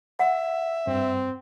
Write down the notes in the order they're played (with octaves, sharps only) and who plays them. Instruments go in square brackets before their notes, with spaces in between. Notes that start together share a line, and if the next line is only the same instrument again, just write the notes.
[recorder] E5 [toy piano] F#5
[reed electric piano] G2 [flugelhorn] C4